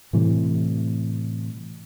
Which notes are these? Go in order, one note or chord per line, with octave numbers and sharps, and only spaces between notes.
A2 C3 E3 G3